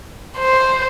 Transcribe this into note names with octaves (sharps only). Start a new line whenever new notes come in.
C5